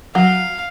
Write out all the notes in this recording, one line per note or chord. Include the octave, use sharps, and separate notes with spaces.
F#3 F5